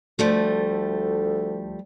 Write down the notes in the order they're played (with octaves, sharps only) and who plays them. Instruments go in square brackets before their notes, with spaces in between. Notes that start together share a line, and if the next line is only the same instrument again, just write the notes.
[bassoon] D2 [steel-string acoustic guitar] F3 G3 A3